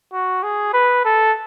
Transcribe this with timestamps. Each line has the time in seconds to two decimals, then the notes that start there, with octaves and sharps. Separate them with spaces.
0.13 F#4
0.43 G#4
0.73 B4
1.05 A4